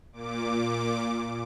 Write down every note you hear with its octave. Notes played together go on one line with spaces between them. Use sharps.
A#2 D6